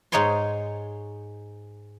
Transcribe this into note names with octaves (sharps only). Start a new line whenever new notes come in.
G#2 D#4 C#5 G#5 C6